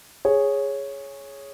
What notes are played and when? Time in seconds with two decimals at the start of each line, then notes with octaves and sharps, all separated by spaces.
0.25 G#4 C#5